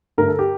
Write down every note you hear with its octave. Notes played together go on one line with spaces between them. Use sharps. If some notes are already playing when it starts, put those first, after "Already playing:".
G2 D3 A3 A#4
A4
G4